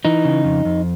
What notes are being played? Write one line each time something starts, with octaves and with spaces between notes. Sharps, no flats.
E3 D#4
C#3
F2
F2